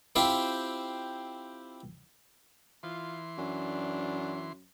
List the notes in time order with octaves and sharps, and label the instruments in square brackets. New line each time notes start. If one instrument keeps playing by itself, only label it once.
[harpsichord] C4 E4 F4 G4 C5
[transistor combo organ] E3 C6 [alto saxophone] F4
[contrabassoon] F#2 [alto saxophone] D4